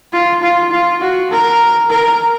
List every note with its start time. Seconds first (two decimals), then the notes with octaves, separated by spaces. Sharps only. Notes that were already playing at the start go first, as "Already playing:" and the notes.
0.13 F4
0.42 F4
0.71 F4
1.01 F#4
1.31 A#4
1.90 A#4